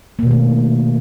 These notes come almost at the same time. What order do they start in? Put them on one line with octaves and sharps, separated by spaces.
A#3 B2 D#3 A3